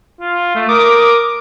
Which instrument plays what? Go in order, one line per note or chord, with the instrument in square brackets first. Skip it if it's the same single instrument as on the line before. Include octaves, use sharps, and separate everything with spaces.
[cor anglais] F4
A3
[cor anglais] A#4 [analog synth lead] D6 [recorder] D#6